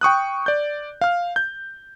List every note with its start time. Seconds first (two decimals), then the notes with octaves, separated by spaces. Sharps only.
0.01 G5 C#6 D#6 F#6
0.46 D5 G6
1.01 F5 F6
1.36 G6